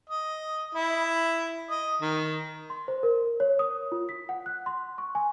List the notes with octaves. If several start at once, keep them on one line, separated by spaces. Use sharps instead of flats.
D#5
E4
D#5
D#3
C6
C5
A#4
C#5
D#6
F4
B6
F#5
F#6
C6
C#6
G#5